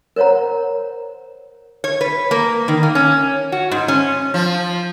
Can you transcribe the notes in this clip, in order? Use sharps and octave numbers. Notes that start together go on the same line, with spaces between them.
A#4 C5 C#5 F#5 A#5
C#5
B4
A#3
D#3
A#3
C#4
F#4
G#2
C#4
F3